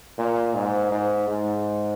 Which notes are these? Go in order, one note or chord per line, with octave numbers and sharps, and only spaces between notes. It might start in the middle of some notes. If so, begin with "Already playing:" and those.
A#2
G#2
G#2
G#2